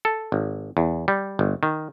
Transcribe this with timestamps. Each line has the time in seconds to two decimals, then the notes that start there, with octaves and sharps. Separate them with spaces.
0.05 A4
0.32 G#1
0.77 E2
1.08 G3
1.39 G1
1.63 D#3